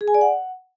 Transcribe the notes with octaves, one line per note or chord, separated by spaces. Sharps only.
G#4
G#5
D5
F#5